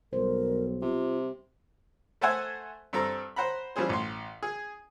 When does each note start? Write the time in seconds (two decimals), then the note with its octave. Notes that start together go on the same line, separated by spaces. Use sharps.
0.13 B1 G3 A#4 C5
0.82 C3 F4
2.21 A3 A4 C5 E5 F#5 G#5
2.93 G2 C4 A4 A#5
3.36 C5 F#5 A#5 B5
3.76 E3 F3 G3 C#4 G#4 C5
3.89 A1 C6
4.43 G#4